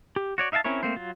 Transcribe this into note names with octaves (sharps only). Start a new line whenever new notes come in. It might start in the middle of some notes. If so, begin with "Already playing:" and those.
G4
F#4 C#5 D5
D#4 E5 F5 G5 A5
C4 C#4 E4 A#4 C#5
A3 A#3 C4 C5
F#3 F4